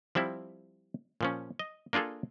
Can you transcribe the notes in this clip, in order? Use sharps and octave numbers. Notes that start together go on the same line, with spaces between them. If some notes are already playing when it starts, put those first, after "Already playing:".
F3 G3 C4 E4
A#2 F3 C#4
D#5
A#3 D4 F4 G#4 A4